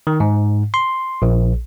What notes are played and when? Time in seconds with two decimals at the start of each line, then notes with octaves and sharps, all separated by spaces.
0.07 D#3
0.20 G#2
0.74 C6
1.22 A#1